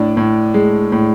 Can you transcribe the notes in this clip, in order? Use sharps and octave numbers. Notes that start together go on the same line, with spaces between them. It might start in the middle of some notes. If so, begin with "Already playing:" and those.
Already playing: A2 D4
A2
G#3
A2